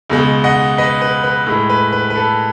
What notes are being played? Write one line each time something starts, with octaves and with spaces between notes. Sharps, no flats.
C#2 B2 G#3
D#5 F#5
B4 D#5
B4
B4
A2 G#3
B4
B4
B4
A4